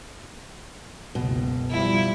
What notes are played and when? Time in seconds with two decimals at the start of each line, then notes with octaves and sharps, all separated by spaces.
1.15 F#1 C#2 B2
1.71 F3 G3 E4